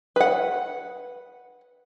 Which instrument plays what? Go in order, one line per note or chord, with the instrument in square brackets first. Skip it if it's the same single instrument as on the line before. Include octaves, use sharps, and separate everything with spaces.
[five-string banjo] B4 F#5